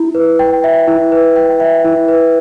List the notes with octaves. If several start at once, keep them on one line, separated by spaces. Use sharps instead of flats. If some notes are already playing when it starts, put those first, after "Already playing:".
Already playing: E4
B4
G5
E5
E4
B4
G5
E5
E4
B4